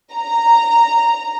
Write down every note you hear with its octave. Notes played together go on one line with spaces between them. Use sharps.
A#5